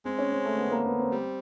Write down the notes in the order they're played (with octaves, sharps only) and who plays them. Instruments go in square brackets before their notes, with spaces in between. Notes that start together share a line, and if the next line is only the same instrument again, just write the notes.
[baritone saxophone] G#3 [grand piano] C4
[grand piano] C#4
C4
A3
B3
A#3
B3
C4
[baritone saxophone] G3